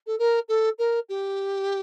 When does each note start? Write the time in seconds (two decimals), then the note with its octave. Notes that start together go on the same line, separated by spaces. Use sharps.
0.07 A4
0.18 A#4
0.48 A4
0.78 A#4
1.09 G4